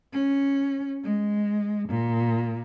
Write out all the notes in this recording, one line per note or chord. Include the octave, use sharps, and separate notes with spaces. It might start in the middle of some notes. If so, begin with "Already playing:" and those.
C#4
G#3
A#2